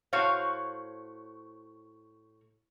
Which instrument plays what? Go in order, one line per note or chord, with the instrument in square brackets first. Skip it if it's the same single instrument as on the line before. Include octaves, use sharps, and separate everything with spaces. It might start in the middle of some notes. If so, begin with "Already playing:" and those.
[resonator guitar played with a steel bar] A2 F#4 C5 C#5 F5